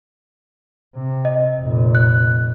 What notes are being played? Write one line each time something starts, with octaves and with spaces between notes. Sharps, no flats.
C3
D#5
F1 A#2
F#6